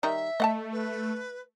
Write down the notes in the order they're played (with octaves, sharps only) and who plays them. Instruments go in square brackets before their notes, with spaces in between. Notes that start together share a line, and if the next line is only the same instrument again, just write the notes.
[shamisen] D#3 G3 D#4 [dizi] E5
[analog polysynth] A3 [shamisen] D#5 F#5 A5
[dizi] B4